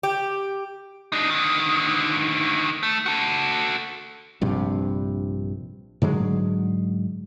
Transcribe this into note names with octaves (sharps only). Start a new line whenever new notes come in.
G4
D4 D#4
D3 D#3
A3
F#4 A4
A#1 G2 C3
G#2 D3 F#3 G#3